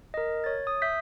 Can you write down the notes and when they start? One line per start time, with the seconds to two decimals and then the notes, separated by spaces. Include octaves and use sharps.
0.14 A#4 D#5
0.44 C#5 A6
0.67 D#6
0.82 E5 G6 B6